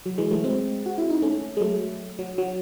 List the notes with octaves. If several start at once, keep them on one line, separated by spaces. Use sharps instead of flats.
F#3
E3 G#3
F#3 A3
G#3 C4
F#4
E4
D#4
A3 C#4
G#3
F#3 A3
F#3
F#3